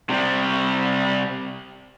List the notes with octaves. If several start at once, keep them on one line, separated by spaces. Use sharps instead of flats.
C3 G3